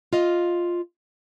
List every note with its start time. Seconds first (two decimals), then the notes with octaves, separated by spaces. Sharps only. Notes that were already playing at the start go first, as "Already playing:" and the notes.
0.13 F4 D#5 F5